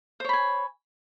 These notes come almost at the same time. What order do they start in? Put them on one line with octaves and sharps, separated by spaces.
C5 C#5 B5 G#5